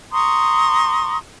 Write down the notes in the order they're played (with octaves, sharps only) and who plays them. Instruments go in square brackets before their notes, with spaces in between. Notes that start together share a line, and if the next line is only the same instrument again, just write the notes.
[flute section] A#5 C6 C#6 D#6